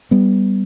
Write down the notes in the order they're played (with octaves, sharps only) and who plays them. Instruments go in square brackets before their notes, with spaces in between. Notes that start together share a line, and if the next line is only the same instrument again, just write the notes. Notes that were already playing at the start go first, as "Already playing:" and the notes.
[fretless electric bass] G3 B3